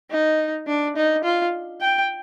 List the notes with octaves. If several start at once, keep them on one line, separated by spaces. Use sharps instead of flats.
D#4
D4
D#4
F4
G5